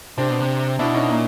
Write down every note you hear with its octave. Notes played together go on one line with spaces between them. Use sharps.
C3 C4 D4
B2
C3
B2 D4 E4
C#4 D#4
A#2